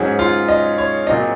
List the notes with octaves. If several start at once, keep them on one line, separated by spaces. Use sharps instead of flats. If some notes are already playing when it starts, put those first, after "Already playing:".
Already playing: G#2 F#3 C#4 G#4
F4
D#5
C#5
A#2 F#3 C4 D#5